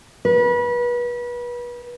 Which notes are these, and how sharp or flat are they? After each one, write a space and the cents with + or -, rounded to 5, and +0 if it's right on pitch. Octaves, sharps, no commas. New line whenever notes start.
B4 -30